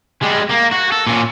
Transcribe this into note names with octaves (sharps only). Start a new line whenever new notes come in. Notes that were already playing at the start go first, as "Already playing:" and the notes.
G3 G#3
A#3
F#4
A4
A#2 C#4